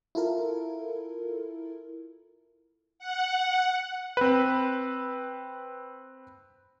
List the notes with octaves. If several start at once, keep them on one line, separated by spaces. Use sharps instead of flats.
E4 F4 A4 A#4
F#5
C4 B4